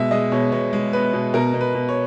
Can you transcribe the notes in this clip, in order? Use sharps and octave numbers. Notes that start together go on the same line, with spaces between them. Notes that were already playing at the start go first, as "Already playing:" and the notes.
Already playing: B2 G#3 E5
G#3 D#5
B2 C#5
B2 C#5
G#3
B3 B4
B2
B2 A#4
B2
B4
B2
C#5